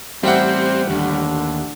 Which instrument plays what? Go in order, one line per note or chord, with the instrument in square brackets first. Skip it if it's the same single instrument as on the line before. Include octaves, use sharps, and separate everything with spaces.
[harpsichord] A1 G4 E5 [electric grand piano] G3 F#5 [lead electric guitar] C4 [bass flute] C5
[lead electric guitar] D#2 [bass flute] D3